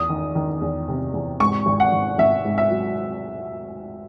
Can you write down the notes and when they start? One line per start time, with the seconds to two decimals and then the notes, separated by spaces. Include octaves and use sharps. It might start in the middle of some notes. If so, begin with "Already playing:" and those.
Already playing: E2 D#6
0.10 D#3
0.35 D#3
0.61 E2
0.88 C3
1.13 E2
1.40 G#2 C#6
1.66 G#1
1.80 F#5
1.92 G#1
2.18 G#1 E5
2.45 G#2
2.58 E5
2.70 F#3